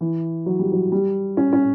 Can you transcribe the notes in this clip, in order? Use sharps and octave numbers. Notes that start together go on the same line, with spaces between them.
E3
F#3
G3
F#3
G3
C#4
C#4